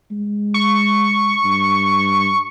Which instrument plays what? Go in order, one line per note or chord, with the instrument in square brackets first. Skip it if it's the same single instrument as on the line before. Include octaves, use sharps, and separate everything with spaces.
[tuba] G#3
[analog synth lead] C#6
[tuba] G2